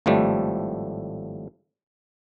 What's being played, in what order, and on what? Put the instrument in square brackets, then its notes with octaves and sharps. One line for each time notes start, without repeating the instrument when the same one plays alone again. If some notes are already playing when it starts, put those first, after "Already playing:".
[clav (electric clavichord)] G#1 A2 F3 G3 A3